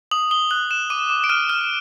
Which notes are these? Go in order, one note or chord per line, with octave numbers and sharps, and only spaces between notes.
D#6 F#7
D#6 G7
F#6 F#7
F#6 E7
D6 D#7
D6
D7
F6 D#7
F6